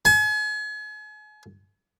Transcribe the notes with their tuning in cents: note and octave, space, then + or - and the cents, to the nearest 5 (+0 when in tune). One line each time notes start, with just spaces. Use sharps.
G#5 +40